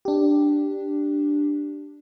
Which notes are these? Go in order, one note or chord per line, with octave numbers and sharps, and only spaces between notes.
D4 G4